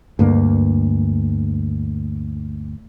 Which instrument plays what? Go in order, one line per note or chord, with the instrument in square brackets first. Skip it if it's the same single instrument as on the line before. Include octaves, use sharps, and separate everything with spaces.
[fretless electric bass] D2 G2 A#3